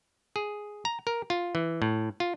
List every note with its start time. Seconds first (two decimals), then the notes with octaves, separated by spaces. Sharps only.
0.36 G#4
0.85 A#5
1.07 A#4
1.30 F4
1.55 E3
1.82 A2
2.20 F4